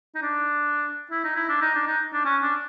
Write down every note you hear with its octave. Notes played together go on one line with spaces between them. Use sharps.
D#4
D4
E4
D#4
E4
D4
D#4
D4
D#4
D4
C#4
D4